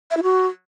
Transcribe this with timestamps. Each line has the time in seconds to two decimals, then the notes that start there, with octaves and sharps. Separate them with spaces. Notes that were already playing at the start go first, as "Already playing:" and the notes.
0.11 E5
0.17 E4
0.23 F#4